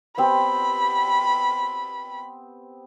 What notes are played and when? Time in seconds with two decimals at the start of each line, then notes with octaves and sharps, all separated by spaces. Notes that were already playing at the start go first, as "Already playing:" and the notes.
0.18 B3 C4 G4 B5